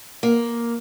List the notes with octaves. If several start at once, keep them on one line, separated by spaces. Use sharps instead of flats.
A#3